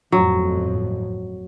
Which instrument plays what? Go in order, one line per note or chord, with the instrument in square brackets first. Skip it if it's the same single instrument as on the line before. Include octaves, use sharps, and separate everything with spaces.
[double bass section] G1 F2 A2 [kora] F#3